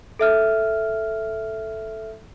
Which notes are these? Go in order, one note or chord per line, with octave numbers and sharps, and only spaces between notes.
A4 E5 F6